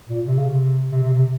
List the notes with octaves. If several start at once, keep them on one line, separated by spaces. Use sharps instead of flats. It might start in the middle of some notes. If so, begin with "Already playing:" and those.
A#2
C3
C#3
C3
C3
C3
C3